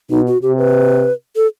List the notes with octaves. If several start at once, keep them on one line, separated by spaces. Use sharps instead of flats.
B2 D#4
F#4
C3 G4
B4
A4